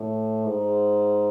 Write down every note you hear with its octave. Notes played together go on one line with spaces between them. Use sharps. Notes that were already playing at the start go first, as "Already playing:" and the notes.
Already playing: A2
G#2